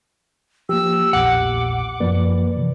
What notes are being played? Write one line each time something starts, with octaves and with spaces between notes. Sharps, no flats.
F3 A#3 G4 E6
A#1 E2 A#2 F#5 D6
F#2 F3 A#3 B4 D5
C3 E3